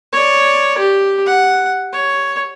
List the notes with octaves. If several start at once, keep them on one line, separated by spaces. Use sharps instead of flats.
C#5 D5
G4
F#5
C#5